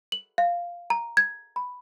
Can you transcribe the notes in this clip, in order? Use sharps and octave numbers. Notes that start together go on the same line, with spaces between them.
F#7
F5
A#5
G#6
B5